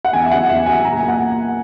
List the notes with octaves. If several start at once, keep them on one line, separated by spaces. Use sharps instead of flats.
F#5
E2 G#5
E5
C#3 F#3 F#5
E2 E5
C#3 F#3 G#5
A#2 A#5
G#5
A#3
F#5